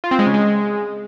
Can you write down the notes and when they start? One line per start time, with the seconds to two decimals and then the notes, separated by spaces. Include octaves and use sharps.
0.04 F4
0.11 C4
0.19 G#3
0.26 C#3
0.34 G#3